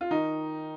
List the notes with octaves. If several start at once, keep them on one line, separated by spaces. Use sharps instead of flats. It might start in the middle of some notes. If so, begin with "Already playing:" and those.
F4
D#3 D#4